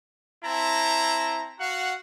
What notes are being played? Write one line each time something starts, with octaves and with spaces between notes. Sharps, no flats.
C4 E4 A5 A#5
F#4 F5 F#5